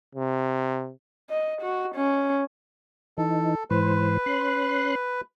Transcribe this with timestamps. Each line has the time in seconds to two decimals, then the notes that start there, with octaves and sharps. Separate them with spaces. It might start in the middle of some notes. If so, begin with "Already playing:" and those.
0.15 C3
1.30 D#5
1.61 F#4
1.95 C#4
3.18 E3 D#4 A4
3.70 G#2 E3 B4 C5
4.26 C#4 C6 F#6